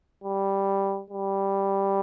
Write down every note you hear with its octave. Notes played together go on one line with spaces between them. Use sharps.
G3
G3